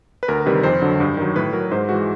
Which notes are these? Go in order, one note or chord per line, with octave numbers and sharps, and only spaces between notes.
B4
D2 A#4
C3 D#3 G3 B4
F2 C5
D3 F#3
G2
D#3 F#3
A2 B4
F#3 A#4
G#2 C5
E3 G#3 F#4